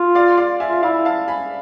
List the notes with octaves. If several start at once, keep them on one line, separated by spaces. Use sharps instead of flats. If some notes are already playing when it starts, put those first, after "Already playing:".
Already playing: F4
D5 F5
D5 F5
E5 G#5
F4
E4 D5 F5
F5 A5
G#5 B5